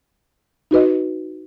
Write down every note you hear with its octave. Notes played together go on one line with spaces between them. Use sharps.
D#4 F#4 B4 D#5